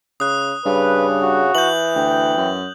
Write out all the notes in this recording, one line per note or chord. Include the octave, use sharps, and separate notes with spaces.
C#3 D#6 F#6
G2 C#3 B4
F#4
E3 G6 F#7
D2 G5
F#2